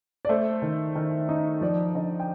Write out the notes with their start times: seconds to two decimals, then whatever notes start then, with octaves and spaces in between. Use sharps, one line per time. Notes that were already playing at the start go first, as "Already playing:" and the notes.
0.25 D5
0.29 A3 C5
0.62 D#3
0.95 D#3
1.29 D#4
1.61 F3 D5
1.95 D3 D#5
2.20 G5